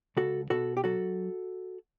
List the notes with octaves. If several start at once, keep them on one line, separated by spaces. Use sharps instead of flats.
C#2 F#4 A4
B2 F#4 A4
G4
F#3 F#4 A4